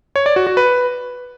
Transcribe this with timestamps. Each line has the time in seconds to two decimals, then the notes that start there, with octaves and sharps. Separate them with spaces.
0.16 C#5
0.26 D5
0.36 F#4
0.47 F#4
0.57 B4